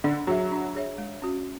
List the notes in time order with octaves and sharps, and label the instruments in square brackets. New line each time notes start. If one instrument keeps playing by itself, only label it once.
[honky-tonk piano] D3 [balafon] D4
[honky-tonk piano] F#3 [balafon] G#4 C#5 E5
[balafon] D4
G#4 C#5 E5
G#3
C#4 F#4